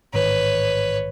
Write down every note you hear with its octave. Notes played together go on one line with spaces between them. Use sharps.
A1 G#2 D#3 B4 C#5